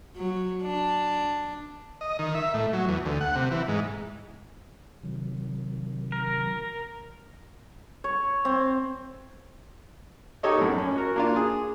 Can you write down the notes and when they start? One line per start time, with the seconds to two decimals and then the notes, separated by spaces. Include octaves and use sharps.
0.16 F#3
0.63 D4
2.01 D#5
2.19 D#3
2.35 E5
2.54 A2
2.73 F#3
2.88 E2
3.05 D2
3.21 F#5
3.35 C3
3.51 E3
3.68 G#2
5.03 C3 D#3 F#3
6.12 A#4
8.04 C#5
8.45 C4
10.43 D#4 G4 A4 C#5 D#5
10.57 F#2 A2
10.78 C#4
10.96 F#4 A#4
11.16 A#3 D4 F4
11.36 G#4